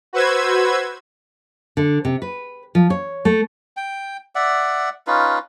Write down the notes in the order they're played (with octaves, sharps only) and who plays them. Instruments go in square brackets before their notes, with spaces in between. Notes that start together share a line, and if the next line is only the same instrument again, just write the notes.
[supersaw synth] F#4 B4 C5 E6 G#6
[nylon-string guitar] D3
C3
B4
F3
C#5
A3
[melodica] G5
D5 E5 F#5
C#4 D#4 F4 B4